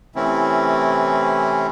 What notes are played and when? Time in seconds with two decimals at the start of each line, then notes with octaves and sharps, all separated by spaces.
0.15 C3 E3 A3 C4 C#4 E4